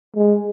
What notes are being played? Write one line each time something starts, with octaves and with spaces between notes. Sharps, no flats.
G#3